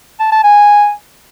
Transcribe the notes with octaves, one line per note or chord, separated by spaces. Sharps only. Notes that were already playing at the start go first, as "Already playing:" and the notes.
A5
A5
G#5